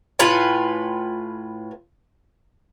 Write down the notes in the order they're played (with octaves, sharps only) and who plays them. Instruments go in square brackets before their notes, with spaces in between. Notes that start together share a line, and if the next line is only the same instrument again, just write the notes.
[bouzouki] A2 F4 B4 G#5